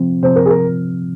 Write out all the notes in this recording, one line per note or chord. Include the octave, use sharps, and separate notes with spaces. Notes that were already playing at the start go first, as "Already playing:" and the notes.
Already playing: C3 F3 C4
C3 F3 C4 C5
A#4
G#4
A#4